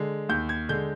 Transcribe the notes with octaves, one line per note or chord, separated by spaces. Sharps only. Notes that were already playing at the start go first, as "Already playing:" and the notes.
Already playing: D3 G#3
D#2 G6
G#6
D3 G#3 G6